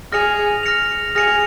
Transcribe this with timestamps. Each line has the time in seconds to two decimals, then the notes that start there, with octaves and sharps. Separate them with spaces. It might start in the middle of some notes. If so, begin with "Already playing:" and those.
0.12 G#4 F6 A#6 C#7 F7
0.63 F6 A#6 C#7 F7
1.15 G#4 F6 A#6 C#7 F7